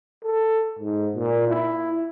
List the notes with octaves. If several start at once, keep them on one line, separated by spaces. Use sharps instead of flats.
A4
G#2
A#2
E4